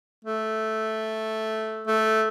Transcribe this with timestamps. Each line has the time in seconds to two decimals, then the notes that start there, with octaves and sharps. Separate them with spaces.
0.25 A3
1.87 A3